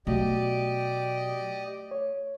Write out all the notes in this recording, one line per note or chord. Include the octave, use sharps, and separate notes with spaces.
B2 F#3 A3 F#4 G4 D5 D#5
C#5